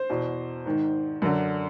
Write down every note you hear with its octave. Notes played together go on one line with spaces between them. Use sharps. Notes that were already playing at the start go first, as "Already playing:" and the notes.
Already playing: C5
E2 B2
G#2 D#3
F#2 D3